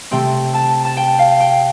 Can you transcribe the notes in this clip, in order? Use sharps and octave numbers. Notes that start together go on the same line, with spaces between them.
C3 A3 C4 G5
A5
A5
G5
F5
G5